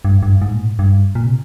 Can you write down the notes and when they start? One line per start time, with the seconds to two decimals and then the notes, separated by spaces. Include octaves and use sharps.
0.05 G2
0.23 G2
0.42 G#2
0.53 A#2
0.60 G#2
0.79 G2
1.15 A#2
1.26 C3